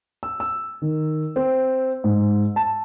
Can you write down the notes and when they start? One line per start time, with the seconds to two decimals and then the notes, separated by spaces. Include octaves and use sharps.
0.23 E6
0.40 E6
0.82 D#3
1.36 C4
2.04 G#2
2.56 A5